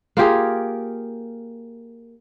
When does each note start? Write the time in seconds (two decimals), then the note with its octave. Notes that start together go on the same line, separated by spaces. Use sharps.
0.17 A#3 F4 G4 G#4